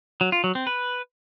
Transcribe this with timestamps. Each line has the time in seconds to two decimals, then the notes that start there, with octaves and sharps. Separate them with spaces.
0.21 F#3
0.32 F4
0.44 F#3
0.55 C4
0.67 B4